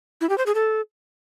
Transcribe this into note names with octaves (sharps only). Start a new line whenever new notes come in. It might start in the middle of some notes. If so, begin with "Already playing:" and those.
E4
G4
C5
G#4
A4